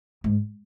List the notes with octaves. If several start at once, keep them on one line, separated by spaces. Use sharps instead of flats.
G#2